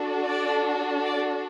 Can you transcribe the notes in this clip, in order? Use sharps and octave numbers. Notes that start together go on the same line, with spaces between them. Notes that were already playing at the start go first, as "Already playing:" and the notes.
Already playing: D4 F#4 A4
D5
D5